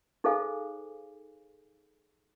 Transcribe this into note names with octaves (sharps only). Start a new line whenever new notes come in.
D#4 G#4 A4 C5 F5 G#5